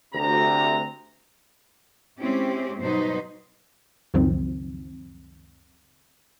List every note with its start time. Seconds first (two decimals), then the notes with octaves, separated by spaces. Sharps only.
0.14 D2 C3 A#5
2.19 G#3 C4 C#4 E4 G4
2.79 G2 B2 F#3 D#4 B4 C5
4.14 C#2 F#2 D#3 F3 F#3 C4